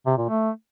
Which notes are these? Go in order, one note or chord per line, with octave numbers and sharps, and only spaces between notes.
C3
A#2
A3